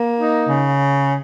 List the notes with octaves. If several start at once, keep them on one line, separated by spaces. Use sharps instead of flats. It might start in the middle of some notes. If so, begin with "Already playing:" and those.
Already playing: A#3
D#4
C#3